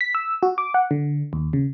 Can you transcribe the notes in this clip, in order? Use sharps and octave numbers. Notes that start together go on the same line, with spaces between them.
B6
E6
F#4
D6
F#5
D3
D#2
C#3